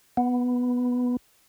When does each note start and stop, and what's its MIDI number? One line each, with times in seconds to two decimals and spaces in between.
0.17 1.17 59